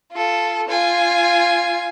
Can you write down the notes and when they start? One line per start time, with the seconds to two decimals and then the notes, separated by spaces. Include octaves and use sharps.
0.12 F4 A4
0.68 F4 G#5